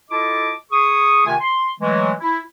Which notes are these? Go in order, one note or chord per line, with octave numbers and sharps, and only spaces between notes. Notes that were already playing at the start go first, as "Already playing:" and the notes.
E4 F4 A4 D#5 A5 D6
G#4 C#6 D#6
C3 D#3 A3 F4 G#5
C6
E3 F#3 G#3 A3
E4